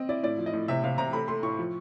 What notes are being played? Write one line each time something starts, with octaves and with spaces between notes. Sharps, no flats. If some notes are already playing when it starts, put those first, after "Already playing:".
Already playing: C4 D#5
E4 D5
A2 D5
F3
D#5
A2
C3 E5
C3 F5
C3 A#5
A3 B5
A3 C6
A2 C#6
F3